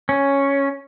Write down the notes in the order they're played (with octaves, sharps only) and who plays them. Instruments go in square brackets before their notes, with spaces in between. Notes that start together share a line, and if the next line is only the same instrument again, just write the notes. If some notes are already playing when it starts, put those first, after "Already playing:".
[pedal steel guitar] C#4